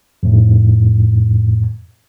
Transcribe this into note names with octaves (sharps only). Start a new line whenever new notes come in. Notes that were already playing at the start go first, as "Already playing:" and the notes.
F2 A2